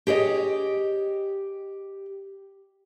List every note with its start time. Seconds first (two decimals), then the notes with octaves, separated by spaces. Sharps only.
0.07 G4 G#4 C#5 D#5